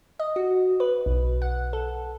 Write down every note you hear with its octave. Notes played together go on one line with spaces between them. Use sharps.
D#5
F#4
B4
B1
F#5
A4